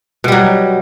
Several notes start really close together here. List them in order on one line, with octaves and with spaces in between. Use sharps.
B2 G3 F#3